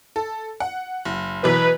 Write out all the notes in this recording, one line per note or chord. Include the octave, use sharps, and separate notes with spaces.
A4
F#5
F#1
B2 E3 F#3 B4